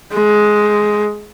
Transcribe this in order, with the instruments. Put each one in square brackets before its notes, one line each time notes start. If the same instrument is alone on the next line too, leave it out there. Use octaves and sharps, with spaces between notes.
[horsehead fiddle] G#3